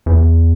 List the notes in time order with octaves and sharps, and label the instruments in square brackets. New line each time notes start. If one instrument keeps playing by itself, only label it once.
[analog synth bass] E2